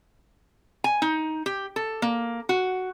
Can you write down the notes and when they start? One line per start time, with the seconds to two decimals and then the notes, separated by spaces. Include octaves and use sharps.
0.84 G#5
1.02 D#4
1.46 G4
1.76 A4
2.02 A#3
2.49 F#4